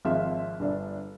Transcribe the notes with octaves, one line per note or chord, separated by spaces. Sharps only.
G#1 F3 C4 E5 F5 C6
G1 D4 D5